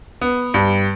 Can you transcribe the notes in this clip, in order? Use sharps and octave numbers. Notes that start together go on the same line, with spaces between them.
B3
G2